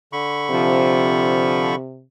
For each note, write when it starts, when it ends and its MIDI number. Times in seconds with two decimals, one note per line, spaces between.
0.13 1.75 50
0.13 1.75 83
0.13 1.75 85
0.51 2.04 48
0.51 1.74 53